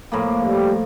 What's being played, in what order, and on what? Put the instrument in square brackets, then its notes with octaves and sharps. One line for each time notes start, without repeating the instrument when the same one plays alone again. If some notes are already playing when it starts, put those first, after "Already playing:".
[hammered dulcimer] A2 F3 A#3
[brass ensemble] G3